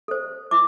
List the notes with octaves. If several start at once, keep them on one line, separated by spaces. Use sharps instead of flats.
A4 C5
E4 D6